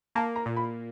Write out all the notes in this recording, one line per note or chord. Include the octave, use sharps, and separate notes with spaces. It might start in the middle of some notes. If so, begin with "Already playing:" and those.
A#3 A5
A#5
A#2
B5